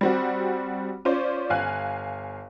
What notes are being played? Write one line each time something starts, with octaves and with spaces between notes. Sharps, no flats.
G3 C4 F#4
C#4 F4 C5 D5
G1 F5 G#5 F#6